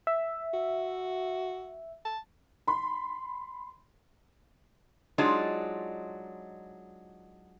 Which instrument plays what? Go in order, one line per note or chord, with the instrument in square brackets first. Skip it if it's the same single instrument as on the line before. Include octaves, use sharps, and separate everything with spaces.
[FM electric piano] E5
[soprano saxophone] F#4
A5
[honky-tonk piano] B5 C6
[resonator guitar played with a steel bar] F#3 G#3 D4 D#4 F4 G#4